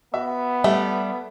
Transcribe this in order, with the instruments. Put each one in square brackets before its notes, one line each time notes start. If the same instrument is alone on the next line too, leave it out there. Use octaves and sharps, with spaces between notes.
[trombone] B3 [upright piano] F#4 E5
[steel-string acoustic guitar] G3 [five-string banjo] A3 [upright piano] E5